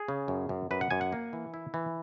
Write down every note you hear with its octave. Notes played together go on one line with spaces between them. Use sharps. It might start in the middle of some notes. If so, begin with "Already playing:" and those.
Already playing: G#4
C#3
F#2
F#2
F#2 B4
F#5
F#2 G#5
F#5
A#3
E3
E4
E3